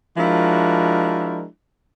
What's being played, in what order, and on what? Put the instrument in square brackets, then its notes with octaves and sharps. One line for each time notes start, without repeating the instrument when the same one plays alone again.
[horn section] F3 G#3 D4 E4 F#4 A#4